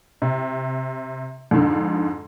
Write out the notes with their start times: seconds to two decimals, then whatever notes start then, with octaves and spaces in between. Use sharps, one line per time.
0.22 C3
1.51 F2 G#2 D3